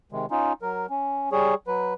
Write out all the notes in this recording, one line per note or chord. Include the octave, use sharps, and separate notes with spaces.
C3 D#3 G#3
C#4 D#4 F4
F#3 A#4
C#4
G3 G#4 C#5
F#3 B4